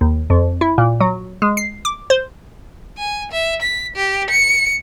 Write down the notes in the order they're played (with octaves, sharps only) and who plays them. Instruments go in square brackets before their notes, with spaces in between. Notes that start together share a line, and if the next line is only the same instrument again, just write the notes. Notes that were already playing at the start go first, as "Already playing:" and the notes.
[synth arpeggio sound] D#2
F2
E4
A#2
F#3
G#3
C7
D6
C5
[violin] G#5
E5
B6
G4
C#7